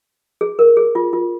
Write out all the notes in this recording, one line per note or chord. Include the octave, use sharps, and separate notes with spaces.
G#4
A#4
G#4
F4
F4